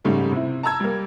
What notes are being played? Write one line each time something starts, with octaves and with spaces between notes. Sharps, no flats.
G#2 C#3 G3 A3
C3 E4
A5 A#5 E6 G#6
G3 A#3